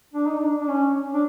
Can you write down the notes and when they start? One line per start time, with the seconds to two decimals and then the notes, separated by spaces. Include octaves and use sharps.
0.13 D4
0.26 D#4
0.40 D4
0.60 D4
0.68 C#4
1.14 D4